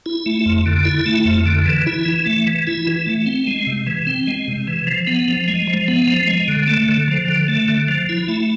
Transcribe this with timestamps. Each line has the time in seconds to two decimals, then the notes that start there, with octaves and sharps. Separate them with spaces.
0.06 E4
0.26 A3
0.46 F2
0.66 D3
0.85 E4
1.06 A3
1.25 F2
1.46 D3
1.66 E3
1.86 E4
2.06 E3
2.26 A3
2.47 E3
2.67 E4
2.87 E3
3.06 A3
3.26 C4
3.47 G#3
3.67 C3
3.87 E3
4.07 C4
4.27 G#3
4.48 C3
4.67 E3
4.87 F3
5.07 B3
5.28 F3
5.48 G#3
5.67 F3
5.88 B3
6.07 F3
6.28 G#3
6.48 D3
6.68 A3
6.89 D3
7.08 F3
7.28 D3
7.48 A3
7.68 D3
7.88 F3
8.09 E4
8.28 A3